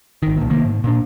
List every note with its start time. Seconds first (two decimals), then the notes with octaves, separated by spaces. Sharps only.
0.22 G#1 D#3
0.37 C2 A#2
0.50 C3 D#3 A#3
0.65 G#2
0.84 A#2 D4